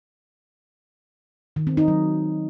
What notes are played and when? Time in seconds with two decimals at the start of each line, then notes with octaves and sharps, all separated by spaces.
1.56 D#3
1.67 C4
1.77 D#4
1.88 F#3